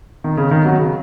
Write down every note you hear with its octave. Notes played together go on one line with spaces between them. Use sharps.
D#3
C#3
D#3
F#3
C#3